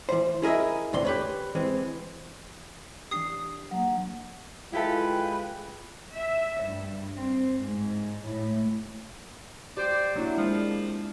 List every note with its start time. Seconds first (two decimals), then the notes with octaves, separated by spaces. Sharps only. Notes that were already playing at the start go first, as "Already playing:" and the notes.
0.09 E3 C5
0.42 E4 G#4 A#4 D#5 E5
0.93 B1 E2 D3 C4 C6
1.05 G4 B4 C#5
1.55 E3 G#3 C4
3.11 E3 D4 G4 D#6 C7
3.71 F#3 A#3
4.73 G#3 E4 F4 G4 A4 B4 G5
6.15 E5
6.63 G2
7.15 C4
7.64 G#2
8.26 A2
9.77 G4 C5 D5
10.16 F#3 A#3 D4 E4
10.37 C3 F3 G#3 A#3 D4